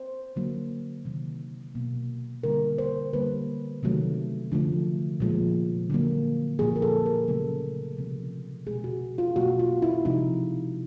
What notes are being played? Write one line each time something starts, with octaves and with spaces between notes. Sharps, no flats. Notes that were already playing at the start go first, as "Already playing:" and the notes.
Already playing: C5
D3 F#3 A#3
C3 D#3 F#3 A#3
B2 F#3 A#3
D3 G3 A#3 A#4
C5
D3 G3 A#3 B4
C3 D#3 F#3 A3
D3 F3 A3
A#2 F3 G#3
D3 F#3 A#3
A#2 F3 A#3 G#4
A#4
A4
A#4
C#3 F#3 A3 A4
C3 F3 G#3
B2 G#3 G#4
F#4
F4
B2 F#3 A#3 F#4
F4
E4
C3 F3 G#3 D#4